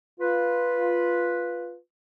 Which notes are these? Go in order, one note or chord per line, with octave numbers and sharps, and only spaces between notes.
F4 B4